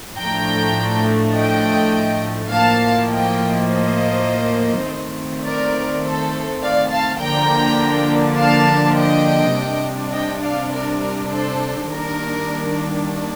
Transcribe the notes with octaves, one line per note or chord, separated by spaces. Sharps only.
A2 F3 A3 D4 G5 A#5
D#5 G5
A2 F3 A#3 F5 A5
D#5 G5
C5 D#5
D#3 A3 C4
A#4 D5
A4 C5
D5 F5
F5 A5
D3 F3 A#3 D4 G5 A#5
F5 A5
D#5 G5
C3 G3 D4
D#5 G5
D5 F5
A#4 D5
A#4
A4 C5
D#3 G3 A#3 D4 A#4